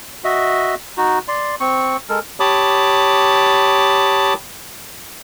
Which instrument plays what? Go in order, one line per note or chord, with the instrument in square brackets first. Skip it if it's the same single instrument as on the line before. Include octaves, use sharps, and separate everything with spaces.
[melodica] F#4 D#5 E5
D#4 F#4
D5 C6
C4 C#6
G#3 A4 A#4
[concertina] G4 C#5 A5 B5 D6 D#6